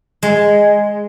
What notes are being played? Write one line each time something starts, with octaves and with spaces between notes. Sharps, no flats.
G#3